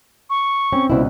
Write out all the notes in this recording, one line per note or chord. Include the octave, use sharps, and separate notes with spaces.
C#6
C4 C#4
C#2 B2 C4 E4 D5